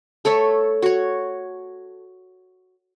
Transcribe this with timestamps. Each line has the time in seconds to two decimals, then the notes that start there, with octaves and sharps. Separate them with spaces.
0.25 A3 A4 C#5 E5
0.82 F#4 C#5